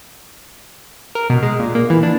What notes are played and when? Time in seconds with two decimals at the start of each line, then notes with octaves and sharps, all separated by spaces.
1.15 A#4
1.30 B2
1.43 G#3
1.59 A#2
1.75 A#3
1.90 E3
2.03 D4